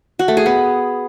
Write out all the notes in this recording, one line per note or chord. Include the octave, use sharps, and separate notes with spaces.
F#4
A3
G#4
B3